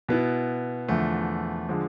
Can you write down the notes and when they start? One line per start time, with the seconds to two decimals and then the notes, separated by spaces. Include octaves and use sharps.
0.09 B2 B3 E4
0.88 E2 D3 F3 A3
1.68 D3 F3 G#3